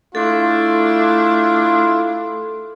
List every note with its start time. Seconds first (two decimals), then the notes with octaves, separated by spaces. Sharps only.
0.15 A3 D4 E4 F4 A4